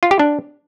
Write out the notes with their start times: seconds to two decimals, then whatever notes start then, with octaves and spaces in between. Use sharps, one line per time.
0.03 F4
0.11 G4
0.19 D4